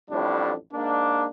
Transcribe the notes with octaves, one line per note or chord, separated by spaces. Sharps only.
A1 F2 A2 G3 D4
G#2 A#3 D4